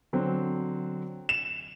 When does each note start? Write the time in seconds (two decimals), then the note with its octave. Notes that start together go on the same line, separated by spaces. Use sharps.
0.13 D3 F#3 C4
1.29 E7